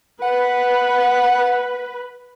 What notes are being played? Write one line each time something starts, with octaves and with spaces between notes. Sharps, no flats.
B4 F#5